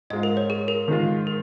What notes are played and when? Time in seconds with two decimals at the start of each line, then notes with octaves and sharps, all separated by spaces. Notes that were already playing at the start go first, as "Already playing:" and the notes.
0.10 G#2 G#3 F4 D#5
0.23 A#4
0.37 C#5
0.50 G#4
0.68 A#4
0.88 D#3 G#3 F4
1.27 A#4